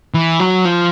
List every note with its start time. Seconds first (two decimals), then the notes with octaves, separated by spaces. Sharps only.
0.14 E3
0.40 F#3
0.65 F3